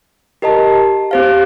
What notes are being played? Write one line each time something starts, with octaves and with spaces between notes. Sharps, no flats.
G4 A#4 D#5 A5
C4 G4 C5 F5